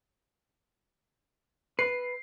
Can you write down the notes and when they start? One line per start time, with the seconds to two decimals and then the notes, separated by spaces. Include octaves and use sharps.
1.79 B4 C7